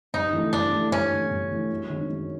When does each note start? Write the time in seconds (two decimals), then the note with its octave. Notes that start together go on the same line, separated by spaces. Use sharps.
0.14 G2 D#4
0.33 E3 A3
0.53 G2 D4
0.72 E3 A3
0.91 G2 C#4
1.12 E3 A3
1.31 G2
1.51 E3 A3
1.71 F#2
1.90 D#3 G#3 C4 D#4
2.09 F#2